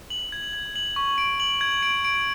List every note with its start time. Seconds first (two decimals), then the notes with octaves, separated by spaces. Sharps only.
0.10 F#7
0.32 G#6
0.53 G#6
0.76 F#7
0.96 C#6
1.18 D7
1.40 F#7
1.61 G#6
1.83 D7
2.05 D7